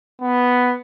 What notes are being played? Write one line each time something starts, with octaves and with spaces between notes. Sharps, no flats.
B3